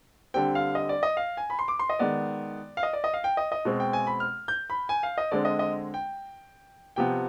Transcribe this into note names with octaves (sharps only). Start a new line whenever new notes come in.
D3 G3 C4 G5
F5
D#5
D5
D#5
F5
G#5
B5
C6
D6
C6
D#5
D#3 G#3 B3 D5
F5
D#5
D5
D#5
F5
G5
D#5
D#5
B2 G#3 C4
G5
G#5
B5
F6
G6
B5
G#5
F5
D#5
D3 G#3 C4 D5
D#5
D#5
G5
C3 F3 B3 G5